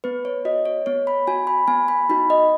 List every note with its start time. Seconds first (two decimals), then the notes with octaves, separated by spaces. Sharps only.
0.04 B3 B4
0.25 C#5
0.45 F#4 D#5
0.66 C#5
0.86 B3 C#5
1.07 B5
1.27 F#4 G#5
1.47 B5
1.68 B3 G#5
1.88 B5
2.09 D#4 F#4 B5
2.30 D#5